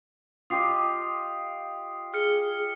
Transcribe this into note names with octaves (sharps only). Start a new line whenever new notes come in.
F4 G4 D#5 D#6 C7
G#4 F6 C#7